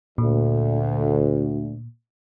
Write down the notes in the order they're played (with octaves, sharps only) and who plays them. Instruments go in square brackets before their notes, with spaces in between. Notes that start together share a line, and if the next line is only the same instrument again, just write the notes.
[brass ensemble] D2 [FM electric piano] A#2